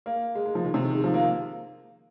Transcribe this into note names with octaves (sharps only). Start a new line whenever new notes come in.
A#3
G#3
G#3
F3
D#3
C3
D#3
G#3
F3
A#3